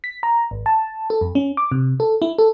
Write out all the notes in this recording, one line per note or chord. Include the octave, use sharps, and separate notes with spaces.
B6
A#5
G#1
A5
A4
F2
C#4
D6
C3
A4
E4
A4